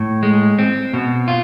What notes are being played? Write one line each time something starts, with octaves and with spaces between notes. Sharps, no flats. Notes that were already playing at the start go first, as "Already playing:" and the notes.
Already playing: A2
G#3
C4
B2
F4